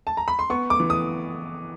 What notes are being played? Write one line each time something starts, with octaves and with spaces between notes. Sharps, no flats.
A5
A#5
B5
C6
B3 C#6
D6
E3
D#6